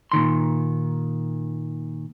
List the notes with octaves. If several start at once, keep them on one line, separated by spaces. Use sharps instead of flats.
A#2 D#3 C6